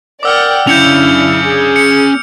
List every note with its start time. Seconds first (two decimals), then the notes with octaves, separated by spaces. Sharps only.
0.23 A#4 D5 F#5 G5 D6 E6 F6
0.67 F#2 C#4 D4 E4 F5 G6 C#7 F7
1.43 G#4
1.76 C#7